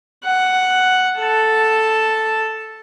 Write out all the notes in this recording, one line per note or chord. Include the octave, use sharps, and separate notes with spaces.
F#5
A4 A5